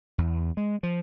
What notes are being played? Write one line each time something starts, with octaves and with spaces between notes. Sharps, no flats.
E2
G#3
F3